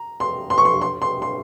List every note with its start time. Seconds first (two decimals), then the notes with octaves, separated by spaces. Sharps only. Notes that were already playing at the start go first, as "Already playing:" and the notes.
Already playing: A#5
0.20 C6
0.50 C6
0.58 C#6
0.65 C6
0.81 C6
1.02 C6
1.22 C6